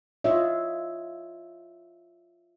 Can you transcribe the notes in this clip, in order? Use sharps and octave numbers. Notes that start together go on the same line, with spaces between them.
F4 C#5 D#5 E5